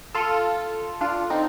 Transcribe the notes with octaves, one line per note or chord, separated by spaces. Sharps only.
F4 A4
D4 F4
C4 D#4